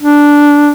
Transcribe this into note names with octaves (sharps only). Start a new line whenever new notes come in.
D4